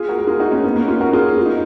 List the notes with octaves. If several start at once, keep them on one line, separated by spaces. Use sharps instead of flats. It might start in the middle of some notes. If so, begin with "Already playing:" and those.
Already playing: F4 G#4
F#4 A#4
A#4
F4 G#4
D#4 F#4
A#3 C#4
B3 D#4
A#3 C#4
C#4 F4
F#4 A#4
F4 G#4
F4
D#4